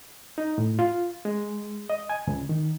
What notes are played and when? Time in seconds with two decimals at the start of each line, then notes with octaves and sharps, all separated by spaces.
0.38 D#4
0.58 A2
0.79 F4
1.25 G#3
1.90 D#5
2.09 G#5
2.27 C#2
2.49 D#3